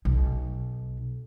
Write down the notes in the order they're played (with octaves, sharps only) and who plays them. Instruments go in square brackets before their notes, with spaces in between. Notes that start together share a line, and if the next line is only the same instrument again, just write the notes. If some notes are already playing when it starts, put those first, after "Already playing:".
[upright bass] B1